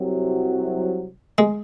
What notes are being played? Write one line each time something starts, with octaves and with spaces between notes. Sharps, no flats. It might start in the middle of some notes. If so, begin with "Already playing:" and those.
Already playing: C2 C3 F#3
G#3